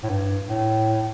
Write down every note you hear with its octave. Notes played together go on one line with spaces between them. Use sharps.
A2
G2
A2